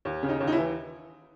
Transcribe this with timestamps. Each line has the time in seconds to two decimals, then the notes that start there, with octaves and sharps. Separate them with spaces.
0.05 D#2
0.23 C#3
0.29 D#4
0.40 D#2
0.47 D#4
0.52 E4
0.58 E3